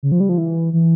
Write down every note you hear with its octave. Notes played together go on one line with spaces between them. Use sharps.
C#3
F3
G3
F3
E3
E3